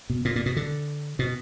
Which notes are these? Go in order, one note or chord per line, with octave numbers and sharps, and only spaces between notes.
B2
A#2
A#2
B2
D3
B2